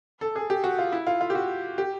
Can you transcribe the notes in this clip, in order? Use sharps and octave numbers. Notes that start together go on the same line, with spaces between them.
A4
G#4
G4
F#4
F4
E4
F4
F4
G4
F#4
G4